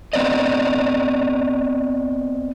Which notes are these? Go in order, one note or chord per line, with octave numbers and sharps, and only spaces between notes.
B3 C4 D5 D#5